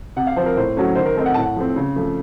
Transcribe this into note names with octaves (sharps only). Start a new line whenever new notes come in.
C3 F#5
F5
F3 C4 C5
A#4
A2 C5
F#3 A3 C#4
D#3 C5
A#4
A3 C4 D#4 A#4
F#5
A2 A5
F#5
F3 A3 C4
C#3
F3 A3